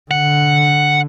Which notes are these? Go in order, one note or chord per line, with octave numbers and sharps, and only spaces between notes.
D3 F#5